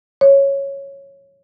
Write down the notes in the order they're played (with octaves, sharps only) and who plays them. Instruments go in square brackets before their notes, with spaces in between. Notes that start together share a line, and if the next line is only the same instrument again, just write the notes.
[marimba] C#5